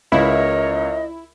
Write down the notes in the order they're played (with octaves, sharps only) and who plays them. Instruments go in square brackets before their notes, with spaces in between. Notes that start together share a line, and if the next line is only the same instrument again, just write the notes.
[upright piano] C#2 [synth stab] E4 [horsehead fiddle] A#4 C#5 [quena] D#5